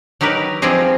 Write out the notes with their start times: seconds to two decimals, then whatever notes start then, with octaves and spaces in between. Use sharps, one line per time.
0.21 F#3 D#4 G4 A#4 B4
0.62 F3 G3 C4 G4 G#4 D#5